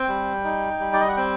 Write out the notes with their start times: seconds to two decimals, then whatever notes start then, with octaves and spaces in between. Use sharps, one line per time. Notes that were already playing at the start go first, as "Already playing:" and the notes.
Already playing: C4 G5
0.08 G3
0.44 D#4
0.80 G3
0.93 D5
1.00 D#5
1.08 F#5
1.17 C4 G5